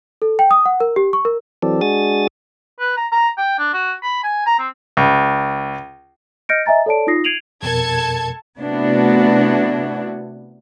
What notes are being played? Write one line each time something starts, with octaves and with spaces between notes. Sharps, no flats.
A4
G5
D#6
F#5
A#4
G4
C#6
A#4
E3 F#3 C4 A4 D5
G#3 D4 F#4 G#4 D#6 A6
B4
A#5
A#5
G5
D4
F#4
B5
G#5
A#5
C4
C#2
D#5 F6 G6 A#6 C#7 D7
D#5 E5 G#5 A#5 A6
A4 C#5 D5 A5 D7
D#4 F4 D#6 A#6 C7
G#6 C7 D7 D#7 F7 F#7
F2 B2 A4 A#4 A5 G#6
C3 A3 B3 D4 E4 F#4